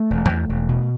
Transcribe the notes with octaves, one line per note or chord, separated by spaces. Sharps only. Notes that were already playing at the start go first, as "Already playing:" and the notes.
Already playing: A3
E1
E2
E1
B2